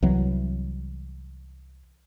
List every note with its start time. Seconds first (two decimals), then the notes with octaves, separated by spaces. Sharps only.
0.02 C2 E3 F#3